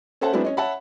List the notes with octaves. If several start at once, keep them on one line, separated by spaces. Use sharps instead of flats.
C#4 A4 C5 E5 F#5 A5
F#3 G#3 B3 C4 D4 E4
C#4 C#5 D#5
C#5 E5 F#5 A5 B5